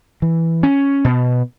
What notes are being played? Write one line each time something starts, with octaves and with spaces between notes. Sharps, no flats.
E3
C#4
B2